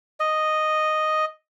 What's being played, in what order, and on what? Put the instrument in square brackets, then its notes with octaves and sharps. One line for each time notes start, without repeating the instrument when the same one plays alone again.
[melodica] D#5